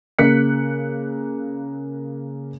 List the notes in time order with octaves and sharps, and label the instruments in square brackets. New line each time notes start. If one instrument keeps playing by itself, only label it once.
[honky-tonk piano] C#3 A#3 F#6 B6 C#7